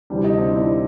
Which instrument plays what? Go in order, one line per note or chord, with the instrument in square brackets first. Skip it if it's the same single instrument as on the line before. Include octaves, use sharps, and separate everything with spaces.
[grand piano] D2 C3 E3 G3 [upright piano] D4
[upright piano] D#4
C4 D4
D4 E4